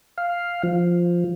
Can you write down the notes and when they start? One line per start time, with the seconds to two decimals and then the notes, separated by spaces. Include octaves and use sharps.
0.18 F5
0.63 F3